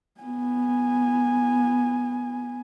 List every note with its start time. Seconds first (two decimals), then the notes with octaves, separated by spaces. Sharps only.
0.21 B3 G#5